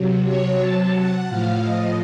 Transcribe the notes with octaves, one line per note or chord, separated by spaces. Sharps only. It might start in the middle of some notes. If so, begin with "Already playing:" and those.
Already playing: C3 F#3
C#5
A5
F#5
A2 F3 F5
D#5